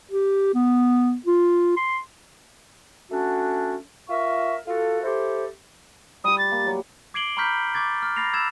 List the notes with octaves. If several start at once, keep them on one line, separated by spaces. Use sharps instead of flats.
G4
B3
F4
C6
A3 C#4 D4 F#4
F4 A#4 E5 C#6
F4 F#4 A4
E4 G4 A4 C5
G3 G4 D#6
A6
A#3
F#3
D6 G#6 C7 D7 F#7 G7
A#5 B5 C#6 F6 G6 B6
C#6 D6 G#6 A6
F6
B5 A6 A#6 C7 F7
B5 E6 G#6 A6 E7